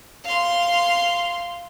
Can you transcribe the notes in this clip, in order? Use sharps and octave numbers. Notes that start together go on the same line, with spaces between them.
F5 C6